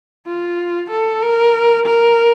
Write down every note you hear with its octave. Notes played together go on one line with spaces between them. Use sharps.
F4
A4
A#4
A#4